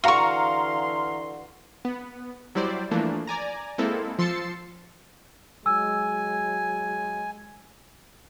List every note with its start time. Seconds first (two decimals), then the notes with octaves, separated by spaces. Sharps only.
0.04 D3 E3 F#4 F5 A#5 C6 C#6
1.85 B3
2.55 F#3 G3 E4 C5 D5
2.91 E3 F3 A3 A#3 D4
3.27 D5 G#5 A#5
3.78 G#3 A#3 C4 E4 A4
4.19 F3 C6 E6 A6 C7 C#7
5.66 F#3 G#3 G#5 E6